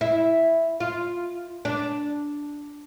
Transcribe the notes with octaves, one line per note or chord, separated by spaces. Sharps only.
E4
F4
D4